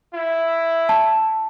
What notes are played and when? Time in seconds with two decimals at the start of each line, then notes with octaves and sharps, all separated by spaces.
0.14 E4
0.89 A5